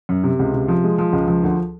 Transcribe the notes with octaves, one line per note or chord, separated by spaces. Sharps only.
F#2
C3
C#2
C3
F3
G#3
F3
C#2
F3
D2